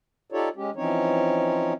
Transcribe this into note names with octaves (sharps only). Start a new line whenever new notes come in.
D#4 F4 G4 A4 C#5 D5
G#3 C#4 G4
E3 F3 C4 C#4 D#4 C#5